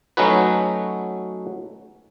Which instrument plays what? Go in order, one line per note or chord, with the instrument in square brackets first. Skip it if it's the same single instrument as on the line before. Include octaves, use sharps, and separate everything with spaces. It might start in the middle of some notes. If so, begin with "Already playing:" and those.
[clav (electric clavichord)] F#3 A3 C#4 D#4 F#4 B4